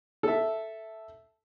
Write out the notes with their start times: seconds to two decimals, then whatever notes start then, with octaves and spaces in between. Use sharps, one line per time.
0.23 A4 E5